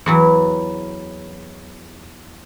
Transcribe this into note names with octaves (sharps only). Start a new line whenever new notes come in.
E2 E3 F#3